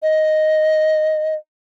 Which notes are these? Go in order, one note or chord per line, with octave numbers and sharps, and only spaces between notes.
D#5